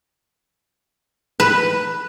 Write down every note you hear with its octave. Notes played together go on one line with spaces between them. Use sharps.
B4